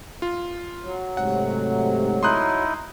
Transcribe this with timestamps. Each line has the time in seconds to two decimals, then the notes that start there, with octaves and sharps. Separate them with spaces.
0.22 F4
0.83 F#3
1.17 G#2 C3 A3 F#5
2.23 D#4 E4 C6 D#6 F#6